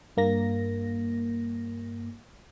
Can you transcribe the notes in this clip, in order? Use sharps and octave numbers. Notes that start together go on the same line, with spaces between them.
G2 A#3 A#6